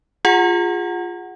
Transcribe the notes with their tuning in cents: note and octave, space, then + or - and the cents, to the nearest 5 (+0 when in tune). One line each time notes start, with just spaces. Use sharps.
F4 +0 G#4 -20 F#5 +0